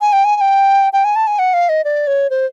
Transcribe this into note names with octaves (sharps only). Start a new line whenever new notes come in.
G#5
G5
G#5
G#5
G5
G5
G#5
A5
G#5
F#5
F5
D#5
D5
C#5
C5